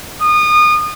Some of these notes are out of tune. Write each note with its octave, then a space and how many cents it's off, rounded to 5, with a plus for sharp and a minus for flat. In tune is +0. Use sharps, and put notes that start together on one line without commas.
D#6 -30